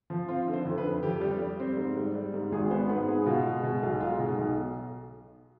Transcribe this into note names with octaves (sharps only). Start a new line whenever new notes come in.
F3
C4 F4
D3
C5
F2
B4
D3
F2 G4
G3
G3
C4
G#2
G3
G3
G#2
G#1 G#4
B3 C5
G#2 B4
B3 G#4
B2 F4
G#3
B2
B1
G#3 F4
B2
D#4
B1